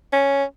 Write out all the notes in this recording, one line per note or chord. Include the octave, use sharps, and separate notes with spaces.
C#4